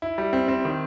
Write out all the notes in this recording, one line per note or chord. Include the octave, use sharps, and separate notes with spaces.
E4
G3
C4
C4
D#3